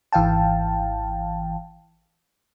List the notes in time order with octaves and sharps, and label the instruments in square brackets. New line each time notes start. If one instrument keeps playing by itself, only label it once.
[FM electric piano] G#1 E3 F5 G5 A5